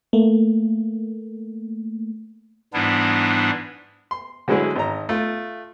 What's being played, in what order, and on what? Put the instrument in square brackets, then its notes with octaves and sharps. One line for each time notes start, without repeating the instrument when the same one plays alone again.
[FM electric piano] A3 A#3
[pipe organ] G#2 E3 G3 B3 D4 E4
[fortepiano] C6
D3 F#3 G#3 C#4 E4 G#4
G#1 A#5
A3 F4